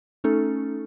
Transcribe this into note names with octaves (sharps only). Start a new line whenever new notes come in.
A3 C#4 D#4 A4